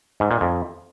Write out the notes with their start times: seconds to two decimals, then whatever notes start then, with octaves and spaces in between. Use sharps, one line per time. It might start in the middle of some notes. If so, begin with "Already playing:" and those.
0.20 G#2
0.31 A#2
0.41 F2